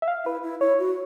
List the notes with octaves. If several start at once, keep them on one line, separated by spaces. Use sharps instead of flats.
E5
F5
E4 B4
E4
E4 C#5
F#4